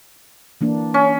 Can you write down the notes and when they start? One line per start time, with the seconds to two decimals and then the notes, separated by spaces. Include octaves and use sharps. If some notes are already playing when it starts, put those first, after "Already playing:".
0.61 E3 A#3 D4
0.94 C#4